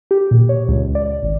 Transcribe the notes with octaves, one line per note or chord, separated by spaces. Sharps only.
G4
A#2
C#5
C#2
D5
G#1